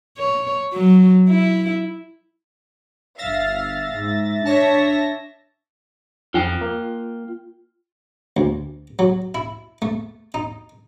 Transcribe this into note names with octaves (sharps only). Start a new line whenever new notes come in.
C#5
F#3
E4
G1 E5 F5 A6 A#6
G#2
D4 C#5 E5 A5 A#6
F2 F4 G5
A#3
D2
F#3
E4
A3
D#4